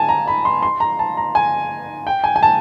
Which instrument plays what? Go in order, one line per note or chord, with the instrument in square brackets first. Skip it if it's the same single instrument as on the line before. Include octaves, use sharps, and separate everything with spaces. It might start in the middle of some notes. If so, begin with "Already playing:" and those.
Already playing: [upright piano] G#5 A5
A#5
B5
C6
C6
A#5
A5
A#5
G#5
G5
G#5
G#5
A5